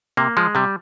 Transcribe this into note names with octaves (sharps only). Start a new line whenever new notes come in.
C3 A#3
F3 G#3
C3 G3